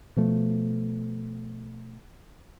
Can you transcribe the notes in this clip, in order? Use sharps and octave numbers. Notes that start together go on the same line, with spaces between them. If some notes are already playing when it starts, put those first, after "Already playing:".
B2 F3 A3